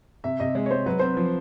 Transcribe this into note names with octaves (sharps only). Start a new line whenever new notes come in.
C3 E5
C3 D#5
G#3
C#5
G#3 C5
F#3 B4
C4 C5
F3 B4